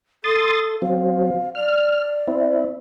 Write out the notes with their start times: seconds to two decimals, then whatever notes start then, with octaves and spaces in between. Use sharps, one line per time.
0.24 A4 C6 D#6 A6
0.82 F#3 C4 F5
1.55 D5 F6
2.27 C4 E4